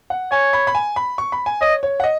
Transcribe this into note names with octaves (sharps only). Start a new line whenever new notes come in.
F#5
C#5 G#5
B5
B5
G#5
B5
C#6
B5
G#5
C#5 D#5
C#5
F#5
D#5